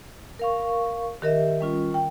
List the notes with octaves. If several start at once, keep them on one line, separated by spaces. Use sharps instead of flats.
A#4 F5 C#6
D#3 G4 A#4 D#5 E5
G3 C#4 F4
G5